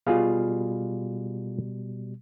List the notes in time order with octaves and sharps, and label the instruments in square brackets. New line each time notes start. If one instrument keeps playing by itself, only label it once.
[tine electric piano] B2 G3 [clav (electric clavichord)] F4 G#4 F5